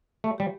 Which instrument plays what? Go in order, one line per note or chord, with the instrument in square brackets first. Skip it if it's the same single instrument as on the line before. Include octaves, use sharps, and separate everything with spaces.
[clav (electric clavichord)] A3 [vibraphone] G4
[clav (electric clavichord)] G3 [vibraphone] G4